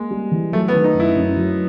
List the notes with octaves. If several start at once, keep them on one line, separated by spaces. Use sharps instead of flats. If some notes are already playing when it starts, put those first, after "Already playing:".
Already playing: G#3 A#3
G3
E3
F#3 A3
B3
D#3
D#4
F#2
E4
F#2
F#3